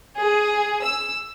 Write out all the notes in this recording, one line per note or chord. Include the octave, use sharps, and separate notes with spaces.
G#4
E6